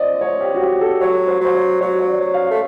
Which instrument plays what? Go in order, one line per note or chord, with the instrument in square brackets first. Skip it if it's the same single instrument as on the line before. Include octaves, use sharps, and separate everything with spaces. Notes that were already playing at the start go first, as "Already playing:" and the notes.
Already playing: [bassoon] F3 [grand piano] D5 D#5
[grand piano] C#5
G4
F#4
G4
A4
[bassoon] F#3 [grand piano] C#5
[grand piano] C5
[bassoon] F#3 [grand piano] C5
[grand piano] C#5
[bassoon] F#3 [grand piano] C#5
[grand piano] C#5
D5
[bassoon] F#3
[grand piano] F5
[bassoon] A3